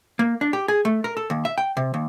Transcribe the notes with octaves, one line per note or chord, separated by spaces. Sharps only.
A#3
D4
G4
G#4
A3
A#4
A4
D#2
E5
G5
C3
D#2